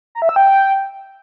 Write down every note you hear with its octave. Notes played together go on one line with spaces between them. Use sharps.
A#5
E5
E6
G5